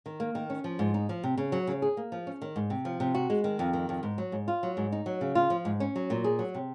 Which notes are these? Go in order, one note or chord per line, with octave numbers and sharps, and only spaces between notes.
D#3
A#3
D#3
C#4
F3
G#2
D#4
F3
C3
C#3
F#3
C#3
G#4
A#3
F3
C#4
D#3
G#2
C3
F3
C3
F#4
G#3
D#3
F2
D#3
F2
G#2
F#3
G#2
F4
F#3
G#2
D#4
F#3
C#3
F4
F3
G#2
C#4
F#3
A#2
G#4
F#3
C3